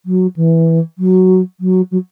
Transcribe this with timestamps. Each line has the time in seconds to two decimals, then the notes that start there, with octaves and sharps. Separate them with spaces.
0.05 F#3
0.36 E3
0.98 F#3
1.60 F#3
1.91 F#3